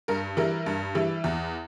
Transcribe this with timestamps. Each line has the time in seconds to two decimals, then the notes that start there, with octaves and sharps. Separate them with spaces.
0.08 G2 A#4
0.37 E3 G3 A#4
0.66 G2
0.95 E3 G3
1.24 E2